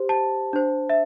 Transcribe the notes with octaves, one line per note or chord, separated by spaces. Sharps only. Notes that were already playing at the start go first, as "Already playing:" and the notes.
Already playing: G4 C5
A5
D4 C5
E5